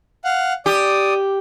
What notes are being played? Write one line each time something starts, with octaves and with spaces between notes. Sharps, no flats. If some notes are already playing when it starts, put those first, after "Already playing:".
F5 F#5
G4 D5 D#6